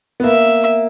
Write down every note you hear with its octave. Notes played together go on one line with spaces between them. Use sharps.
B3
A#3 E5